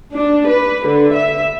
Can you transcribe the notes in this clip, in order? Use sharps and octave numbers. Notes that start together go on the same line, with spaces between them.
D4
B4
D3
E5